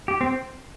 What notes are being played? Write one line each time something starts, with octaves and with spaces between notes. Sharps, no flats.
G4
C4